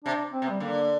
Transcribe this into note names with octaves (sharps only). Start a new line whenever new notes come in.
C3 D4
C4
C3
G3
D3 A#3